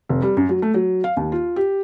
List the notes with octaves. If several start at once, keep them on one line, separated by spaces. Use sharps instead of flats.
F1
G3
F#2
F#3
A3
F#3
F5
D#2
F4
G4